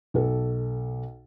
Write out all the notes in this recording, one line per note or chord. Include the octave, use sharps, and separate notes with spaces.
B1 A4